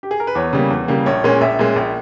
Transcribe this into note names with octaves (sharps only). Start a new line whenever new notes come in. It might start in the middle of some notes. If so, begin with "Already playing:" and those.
G4
G#4
A#4
B4
E2 C#5
C#3 G3 A#3
E2
C#3 G3 A#3
A#1 C#5
A#2 G#3 C#4
A#1 E5
A#2 G#3 C#4
A#1